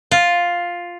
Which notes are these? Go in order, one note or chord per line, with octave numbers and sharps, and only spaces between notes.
F4